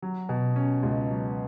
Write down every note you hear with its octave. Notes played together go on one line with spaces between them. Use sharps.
F#3
B2
C#4
C#2
F#3